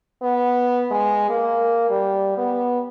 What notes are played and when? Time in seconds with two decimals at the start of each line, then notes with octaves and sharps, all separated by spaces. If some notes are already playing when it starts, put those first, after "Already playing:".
0.23 B3
0.91 G#3
1.29 A#3
1.90 G3
2.38 B3